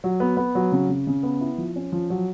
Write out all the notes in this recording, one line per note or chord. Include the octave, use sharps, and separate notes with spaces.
F#3
B3
B3
F#3
C#3
C#3
C#3
B3
E4
F3
C#4
F3
F#3